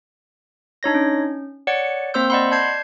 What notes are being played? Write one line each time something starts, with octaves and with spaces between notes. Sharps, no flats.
D4 D#4 C#5 A#6
C#4
C#5 D5 F#5 C#7
A#3 C4 C5 C6 E6 G6
D5 D#5 F#5 B5 C6
D5 A5 G6 G#6 C7